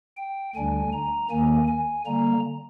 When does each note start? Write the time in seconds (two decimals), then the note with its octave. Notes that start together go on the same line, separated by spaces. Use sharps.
0.17 G5
0.55 D2 D3 G3 D4 G#5
0.93 A#5
1.31 D#2 D#3 A#3 G#5
1.68 G#5
2.06 D3 G3 A#3 A#5